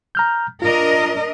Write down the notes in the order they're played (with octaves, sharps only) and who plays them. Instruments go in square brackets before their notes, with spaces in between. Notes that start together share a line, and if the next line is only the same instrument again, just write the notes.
[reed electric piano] A#5 F6 G6
[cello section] D4 A#4 D#5 [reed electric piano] F4